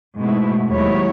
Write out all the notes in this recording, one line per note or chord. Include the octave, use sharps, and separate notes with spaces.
G#2 B2 A3 E4
D#2 G#2 F#3 E4 C#5